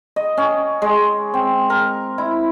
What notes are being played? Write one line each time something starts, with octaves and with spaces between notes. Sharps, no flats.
D#5
C#4
G#3
C4
A#4
E4